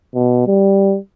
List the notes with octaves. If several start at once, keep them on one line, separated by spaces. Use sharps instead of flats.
B2
G3